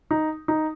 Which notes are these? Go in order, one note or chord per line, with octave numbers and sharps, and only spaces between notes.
D#4
D#4